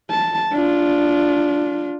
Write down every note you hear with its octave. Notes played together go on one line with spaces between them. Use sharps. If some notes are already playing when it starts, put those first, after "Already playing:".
A5
D4 F4